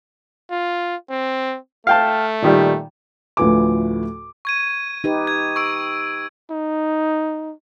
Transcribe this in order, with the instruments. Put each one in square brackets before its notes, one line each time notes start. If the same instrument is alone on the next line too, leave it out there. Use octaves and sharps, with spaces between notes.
[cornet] F4
C4
[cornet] A3 [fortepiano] F5 G5 A5
[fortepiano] A#2 D#3 G3
[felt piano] D2 A2 F3 B4 G#5 D6
[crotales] C#6 G#6 D#7
[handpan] D#4 G4 B4
[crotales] G#6
C#6 E6 D7
[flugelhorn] D#4